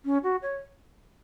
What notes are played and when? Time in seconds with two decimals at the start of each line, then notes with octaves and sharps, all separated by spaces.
0.05 C#4
0.23 F#4
0.42 C#5